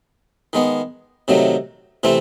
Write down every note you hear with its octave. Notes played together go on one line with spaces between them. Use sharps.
D#3 G#3 B3
C3 D#3 F#3 A3
C3 E3 A3 C4